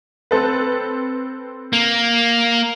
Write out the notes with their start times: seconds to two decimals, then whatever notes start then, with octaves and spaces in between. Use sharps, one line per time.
0.31 C4 A4 B4
1.73 A#3